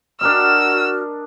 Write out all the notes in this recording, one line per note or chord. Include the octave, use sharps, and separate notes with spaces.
D4 F#4 A#4 D#5 E6 F6